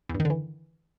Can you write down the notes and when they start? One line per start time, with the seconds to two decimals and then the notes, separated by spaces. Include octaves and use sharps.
0.09 E2
0.15 G2
0.20 D#3
0.25 D3
0.30 E3